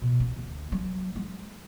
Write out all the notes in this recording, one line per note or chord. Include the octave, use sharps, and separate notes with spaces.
B2
C#4
D2
F#3 C4
G#3